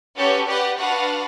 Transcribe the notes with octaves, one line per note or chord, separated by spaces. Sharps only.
C#4 F#4 G4 A4 B4 C#5
G4 B4 D5 F#5
D4 F#4 B4 F5 F#5